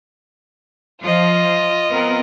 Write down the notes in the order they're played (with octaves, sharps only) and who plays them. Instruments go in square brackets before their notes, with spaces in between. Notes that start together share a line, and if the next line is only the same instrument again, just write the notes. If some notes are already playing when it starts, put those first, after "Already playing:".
[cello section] F3 [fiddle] F4 D#5
[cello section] B3 C4 A#4